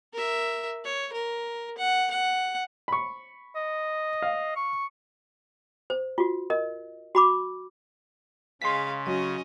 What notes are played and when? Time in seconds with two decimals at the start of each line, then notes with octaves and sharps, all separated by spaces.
0.13 A#4 E5
0.84 C#5
1.13 A#4
1.78 F#5
2.11 F#5
2.88 B5 C#6
3.56 D#5
4.22 F5
4.56 C#6
5.90 C5
6.18 F4 F#4
6.50 A#4 D#5
7.15 F#4 B5 D6
8.62 C#3 G#3 F5 C6 B6
9.07 F#3 C#4 D#5